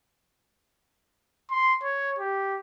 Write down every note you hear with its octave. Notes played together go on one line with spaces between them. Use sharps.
C6
C#5
G4